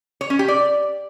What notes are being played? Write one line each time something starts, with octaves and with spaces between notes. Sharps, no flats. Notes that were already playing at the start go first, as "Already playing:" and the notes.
C#5
C#4
G4
D5